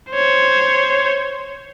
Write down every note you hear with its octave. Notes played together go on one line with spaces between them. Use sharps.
C5 C#5